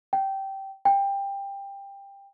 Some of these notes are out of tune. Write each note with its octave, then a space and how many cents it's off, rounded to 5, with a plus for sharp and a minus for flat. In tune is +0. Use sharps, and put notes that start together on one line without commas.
G5 -15
G5 +15